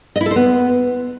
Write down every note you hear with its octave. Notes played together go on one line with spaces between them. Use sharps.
D#5
E4
A4
C5
B3